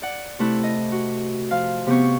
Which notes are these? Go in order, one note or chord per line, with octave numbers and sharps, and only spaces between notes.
D5 F#5
C3 A3 E4 F#6
D#5
F#4
F3 F5
C3 B3 C5 C#6